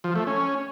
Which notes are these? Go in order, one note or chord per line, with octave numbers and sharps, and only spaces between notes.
F3
A3
C#4